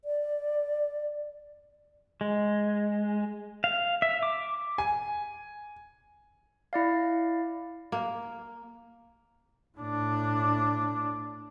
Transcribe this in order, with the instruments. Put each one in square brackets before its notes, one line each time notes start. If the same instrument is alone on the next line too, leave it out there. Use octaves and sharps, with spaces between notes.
[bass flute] D5
[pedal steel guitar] G#3
F5
E5
D6
[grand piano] G#5
[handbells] E4 D5 F5
[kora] A#3
[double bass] A2 D4